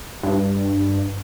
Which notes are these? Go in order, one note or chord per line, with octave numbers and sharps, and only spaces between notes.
G2